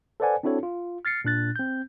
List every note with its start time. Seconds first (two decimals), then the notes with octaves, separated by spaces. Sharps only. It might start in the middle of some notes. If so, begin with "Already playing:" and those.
0.20 A4 B4 C5 D5 F#5 G#5
0.43 C4 D4 E4 F#4 A4 C#5
0.63 F4
1.05 F6 A6 C7 C#7
1.25 A#2 D4 F#6 A6
1.56 C4 G6